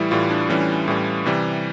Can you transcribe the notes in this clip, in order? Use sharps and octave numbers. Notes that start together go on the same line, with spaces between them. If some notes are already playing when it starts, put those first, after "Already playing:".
Already playing: A2 E3 G3 E4
A2 E3 G3 F4
D4
A2 E3 G3 C#4
A2 E3 G3
C3 E3 G3